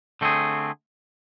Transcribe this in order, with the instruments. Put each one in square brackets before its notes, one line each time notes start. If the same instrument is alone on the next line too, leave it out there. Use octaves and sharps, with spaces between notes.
[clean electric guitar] D3 A3 C4 G#4